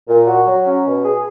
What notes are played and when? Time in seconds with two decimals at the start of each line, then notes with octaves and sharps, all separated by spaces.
0.08 A#2
0.28 F#4
0.47 F#3
0.66 C#4
0.85 B2
1.04 G#4